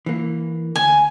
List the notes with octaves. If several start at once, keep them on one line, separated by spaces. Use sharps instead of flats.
E3 A#3
D2 G#5